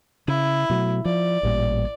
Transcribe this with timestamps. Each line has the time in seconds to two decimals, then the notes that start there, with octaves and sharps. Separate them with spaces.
0.28 C#3 E4
0.69 B2 F#3 A3
1.05 F3 D5
1.43 A1 A#2 G3